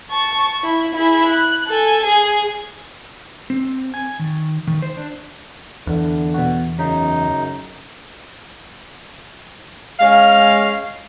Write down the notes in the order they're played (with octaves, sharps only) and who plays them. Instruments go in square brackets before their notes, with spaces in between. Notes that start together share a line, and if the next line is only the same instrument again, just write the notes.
[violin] A5 C#6
E4
E4 G#4
F#6
A4 G#5
G#4
[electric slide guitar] C4
G#5
D#3
D#3
C5
D4
[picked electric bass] E2 [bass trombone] D3
[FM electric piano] B2 F#4
[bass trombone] F#2 [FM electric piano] C#3 [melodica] D#4
[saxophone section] G#3 C#4 F5